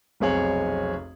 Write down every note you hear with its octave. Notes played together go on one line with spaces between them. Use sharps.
F1 B1 C4 G#4 C#5 F#7